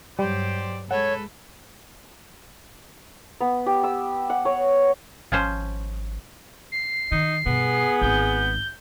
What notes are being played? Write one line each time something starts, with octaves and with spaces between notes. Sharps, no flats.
G2 F#3 G3 G4 C5 D5
G#3 A4 B4 C#5 F#5
B3
G4
E6
F#5
C#5
G#1 F3 C#4 C5
C7
D#3 D#4
G2 B2 B3 G#4
G#1 G#3 G6